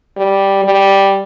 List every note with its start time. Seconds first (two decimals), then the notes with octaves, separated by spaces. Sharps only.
0.17 G3
0.65 G3